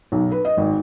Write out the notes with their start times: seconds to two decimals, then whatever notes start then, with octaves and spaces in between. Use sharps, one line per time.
0.12 B1
0.31 B4
0.45 D#5
0.57 G#1